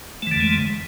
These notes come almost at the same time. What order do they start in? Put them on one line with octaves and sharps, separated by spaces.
A3 E3 D3 F2 G#3